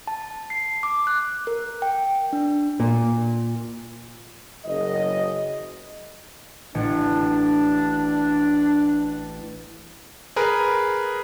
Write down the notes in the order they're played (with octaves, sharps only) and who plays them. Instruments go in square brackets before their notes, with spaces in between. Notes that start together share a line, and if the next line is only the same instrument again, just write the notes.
[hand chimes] A5
C7
D6
F#6
A#4
G5
D4
[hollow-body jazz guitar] A#2
[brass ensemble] F#1 D#5
[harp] A1 [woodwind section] D4
[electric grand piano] G#4 A#4 B4